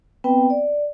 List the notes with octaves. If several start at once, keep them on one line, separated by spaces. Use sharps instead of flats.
B3 C4 B4 G5
D5